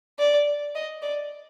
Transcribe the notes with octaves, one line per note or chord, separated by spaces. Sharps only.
D5
D#5
D5